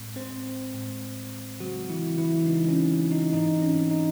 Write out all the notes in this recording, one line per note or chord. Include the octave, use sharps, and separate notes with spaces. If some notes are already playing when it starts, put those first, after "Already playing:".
Already playing: A2 G#3 C4
C4 C5
A2 G#3 C4
C#3 F#3 G#3 C4 F#4
E3 E4
E3 E4
C#3 G#3 C4 D#4
C#4
D#4
G#2 E3 C4 D#4
C#4
D#4